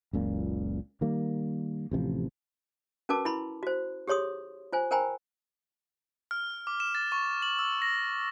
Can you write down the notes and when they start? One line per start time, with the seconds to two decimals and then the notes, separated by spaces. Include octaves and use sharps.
0.13 F#1 C#2 A#2
1.01 D#3 G3 A#3
1.91 A1 C3 D#3 F3
3.09 C#4 F#4 A#4 B4 A5 D6
3.25 E4 B5 C6
3.63 F#4 C5
4.08 G4 G#4 C#5 C6 D#6
4.73 F4 C5 G#5
4.91 A#4 C5 G5 G#5 A#5 B5
6.31 F6
6.67 D6
6.80 E7
6.95 A6
7.12 C#6
7.42 F#7
7.59 E6
7.82 A#6